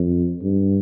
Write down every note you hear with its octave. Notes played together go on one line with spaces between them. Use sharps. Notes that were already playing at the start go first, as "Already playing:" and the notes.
Already playing: F2
G2